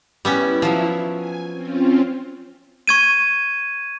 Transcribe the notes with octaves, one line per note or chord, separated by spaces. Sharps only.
G3 B3 C#4 E4
F3 F#3
G#5
C4 C#4 F4
C#6 G#6 D#7